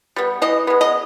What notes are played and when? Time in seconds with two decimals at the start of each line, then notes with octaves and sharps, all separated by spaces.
0.16 G3 B3
0.42 E3 D#5
0.67 G#3 B3
0.81 D#5